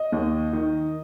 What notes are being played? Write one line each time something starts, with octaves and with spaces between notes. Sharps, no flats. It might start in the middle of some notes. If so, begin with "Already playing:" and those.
Already playing: D#5
D#2
D#3